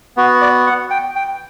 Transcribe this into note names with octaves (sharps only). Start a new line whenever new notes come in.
B3 F#4
D5
F#5
G5
G5